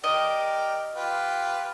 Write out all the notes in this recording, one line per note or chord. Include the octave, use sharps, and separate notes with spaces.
G4 A#4 D5 D#5
F4 G4 B4